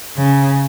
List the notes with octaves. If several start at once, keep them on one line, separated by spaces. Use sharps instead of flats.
C#3